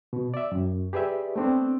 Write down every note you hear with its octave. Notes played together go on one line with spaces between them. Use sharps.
B2
D5 E5
F#2
G4 G#4 B4 D5 E5
A3 B3 C4 D4